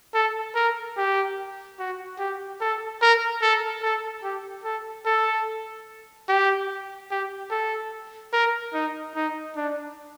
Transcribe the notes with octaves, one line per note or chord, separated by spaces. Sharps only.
A4
A#4
G4
F#4
G4
A4
A#4
A4
A4
G4
A4
A4
G4
G4
A4
A#4
D#4
D#4
D4